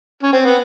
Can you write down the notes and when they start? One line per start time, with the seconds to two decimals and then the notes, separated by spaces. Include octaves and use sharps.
0.23 C#4
0.33 C4
0.45 B3